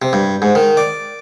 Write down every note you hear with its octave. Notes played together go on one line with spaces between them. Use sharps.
C3
G2
G#2
D#3
D5